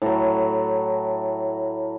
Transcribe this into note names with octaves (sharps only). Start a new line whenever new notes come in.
A2 F#3